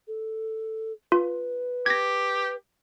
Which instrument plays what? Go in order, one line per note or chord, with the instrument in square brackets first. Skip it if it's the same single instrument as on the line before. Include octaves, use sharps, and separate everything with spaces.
[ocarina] A4
[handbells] F4 [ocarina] B4
[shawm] G4 [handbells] G#6 A#6